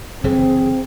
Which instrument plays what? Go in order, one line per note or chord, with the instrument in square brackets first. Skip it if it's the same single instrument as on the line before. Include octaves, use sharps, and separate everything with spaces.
[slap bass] F#1 D3 E3 [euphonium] C4 [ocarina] G#4